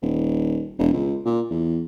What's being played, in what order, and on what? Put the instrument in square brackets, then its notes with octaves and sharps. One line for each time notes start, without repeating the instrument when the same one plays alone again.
[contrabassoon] D#1
E1
C#2
A#2
E2